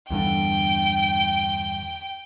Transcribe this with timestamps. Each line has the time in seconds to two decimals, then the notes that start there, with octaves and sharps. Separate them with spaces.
0.10 E2 G2 D3 G5